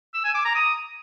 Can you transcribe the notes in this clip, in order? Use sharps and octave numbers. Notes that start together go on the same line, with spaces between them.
E6
G#5
D6
A#5
D#6